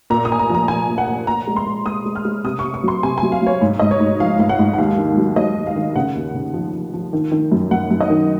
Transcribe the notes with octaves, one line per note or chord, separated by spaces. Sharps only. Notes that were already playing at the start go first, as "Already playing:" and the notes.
A#2 A#5
D#6
A#2 G#5
A#5
F3
A#5
F3 G#5
A#2
F#5
A#2
A#2 A#5
G#3
C6
G#3
G#3 D#6
G#3
F6
G#3
C3 D#6
C#6
C3
C#6
F#3 C6
C3 G#5
F#3 G#5
F5
F#3 C#5
G#2
G#2 D#5
C#5
G#2
F3 F5
G#2 F5
F#5
G#2
F#5
D#2 F5
D#3
F#3
F#3 D#5
D#2
F5
D#3
C#3 F#5
D#2
C#3
F3
F3
F3
D#3
D#3
F#2
F#2 F#5
F#2
D#5
D#3